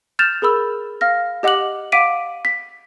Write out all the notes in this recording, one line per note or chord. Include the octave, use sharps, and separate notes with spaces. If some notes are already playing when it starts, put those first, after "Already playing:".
F6 G6 A6 E7 F7
G#4 A#4 B5 E6
F5 F6 A#6
G4 D#5 F#5 D6 F#6 F#7
F5 F#5 D6 B6 D7 D#7
B6